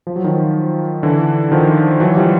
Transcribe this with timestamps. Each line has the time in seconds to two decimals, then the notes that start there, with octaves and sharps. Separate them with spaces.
0.07 F3
0.16 F#3
0.24 D#3 F3
1.03 D3 E3
1.52 D#3 F3
2.00 E3 F#3
2.16 F3 G3